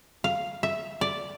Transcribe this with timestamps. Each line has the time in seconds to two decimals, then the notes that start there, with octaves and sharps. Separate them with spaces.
0.24 F5
0.63 E5
1.01 D5